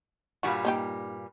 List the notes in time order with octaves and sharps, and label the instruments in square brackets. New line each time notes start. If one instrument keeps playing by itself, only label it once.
[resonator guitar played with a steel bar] G2 A#2 G3 [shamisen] F#4
[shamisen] A#3 D#4 G4